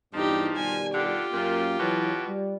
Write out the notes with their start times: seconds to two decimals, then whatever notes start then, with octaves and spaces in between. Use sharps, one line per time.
0.14 E2 G2 F3 D#4 G4
0.56 B2 D#3 G3 G#5
0.94 D3 F4 G4
1.33 F#2 A#2 A#3
1.79 B2 E3 F#3
2.27 G3